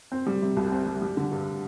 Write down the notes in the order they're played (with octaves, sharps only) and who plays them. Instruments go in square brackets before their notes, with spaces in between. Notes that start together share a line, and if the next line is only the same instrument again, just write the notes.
[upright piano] C4
G3
C3
C2
C4
G3
G3
D3
G2